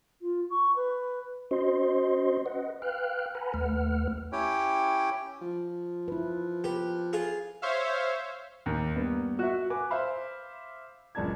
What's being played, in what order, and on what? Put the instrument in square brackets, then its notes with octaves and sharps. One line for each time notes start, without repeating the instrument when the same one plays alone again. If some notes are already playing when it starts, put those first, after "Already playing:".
[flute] F4
C#6
B4
[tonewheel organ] C#4 F#4 C5 D#5 C6
B4 D#5 F#5
B4 F5 G5 F6 F#6
B4 F#5 G#5 A#5 B5
D#2 A3 B4 F#5 F6
[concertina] C#4 E4 G4 C#5 G5
[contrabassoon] F3
[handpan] E4 B4
[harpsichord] G4 [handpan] A#4 B4
[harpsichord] F4 G#4
[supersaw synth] C5 C#5 E5 F5
[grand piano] D#2
G2 A#3 B3
F#4 E5
B4 G#5 D6
C5 E5 F5 B5
F#1 C#2 D4 A5 G#6